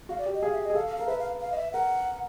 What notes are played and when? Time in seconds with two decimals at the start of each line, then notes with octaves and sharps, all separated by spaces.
0.09 F#4 F5
0.18 D5
0.26 G4
0.34 D#5
0.42 G#4 F5
0.53 E5
0.64 D#5
0.70 G#4
0.75 A4 F5
0.86 F5
0.97 F5
1.00 A#4
1.08 B4 E5
1.19 F5
1.41 F5
1.52 D#5
1.57 E5
1.73 A#4 F#5